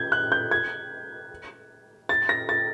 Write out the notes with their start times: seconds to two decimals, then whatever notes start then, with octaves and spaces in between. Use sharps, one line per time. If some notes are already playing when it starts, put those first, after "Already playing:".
Already playing: G6 G#6
0.12 F#6
0.32 G6
0.51 G#6
2.09 A6
2.29 A#6
2.49 A6